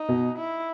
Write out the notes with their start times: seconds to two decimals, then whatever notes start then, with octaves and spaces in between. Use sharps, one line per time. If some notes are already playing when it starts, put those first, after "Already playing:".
Already playing: D#4
0.08 B2
0.38 E4